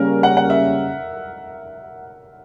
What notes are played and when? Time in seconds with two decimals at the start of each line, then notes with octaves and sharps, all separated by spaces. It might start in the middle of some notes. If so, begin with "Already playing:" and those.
Already playing: C#3 G3 A#3 C#4 A#4
0.23 F#5
0.37 F#5
0.50 E5